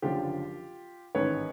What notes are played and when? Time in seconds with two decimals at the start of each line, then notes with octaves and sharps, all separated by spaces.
0.02 F#1 F#2 D3 F3 F4 G4
1.15 A1 G#2 D#3 B4 C#5